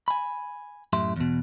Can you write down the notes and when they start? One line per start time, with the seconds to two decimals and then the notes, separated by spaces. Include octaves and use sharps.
0.08 G#5 B5
0.93 F#2 A2 G4 E5 C6
1.16 E2 B2